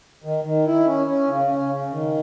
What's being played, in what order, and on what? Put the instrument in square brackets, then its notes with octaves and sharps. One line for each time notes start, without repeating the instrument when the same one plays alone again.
[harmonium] D#3
D#3
E4
C#4
C#4
C#3
C#4
C#3
D#3